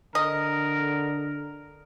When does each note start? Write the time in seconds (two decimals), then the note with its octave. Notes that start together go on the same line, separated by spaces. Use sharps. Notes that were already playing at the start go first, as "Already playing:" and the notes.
0.15 D3 A#4 D#5